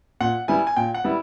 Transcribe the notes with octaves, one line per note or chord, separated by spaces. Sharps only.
A#2 F#5
G3 B3 E4 G#5
G#5
A#2 G5
F#5
G3 B3 E4